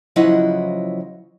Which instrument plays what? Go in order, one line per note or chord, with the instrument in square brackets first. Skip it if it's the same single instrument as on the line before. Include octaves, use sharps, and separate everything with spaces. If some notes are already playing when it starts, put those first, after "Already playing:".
[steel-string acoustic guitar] C#3 F3 F#3 E4 D#5 F#5